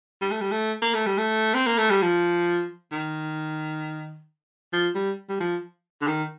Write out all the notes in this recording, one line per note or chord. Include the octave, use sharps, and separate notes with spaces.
G3
A3
G3
A3
A#3
A3
G3
A3
C4
A#3
A3
G3
F3
D#3
F3
G3
G3
F3
D3
D#3